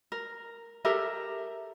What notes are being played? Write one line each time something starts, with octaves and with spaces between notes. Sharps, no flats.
A#4
G4 A4 A#4 E5